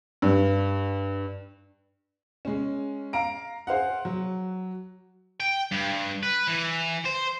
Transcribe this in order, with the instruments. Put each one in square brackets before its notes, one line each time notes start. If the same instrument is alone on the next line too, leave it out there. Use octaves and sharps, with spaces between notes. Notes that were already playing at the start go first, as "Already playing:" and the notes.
[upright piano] G2
G#3 C#4
F5 A#5 D7
G#4 C5 F5 F#5
F#3
[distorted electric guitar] G5
G2
B4
E3
C5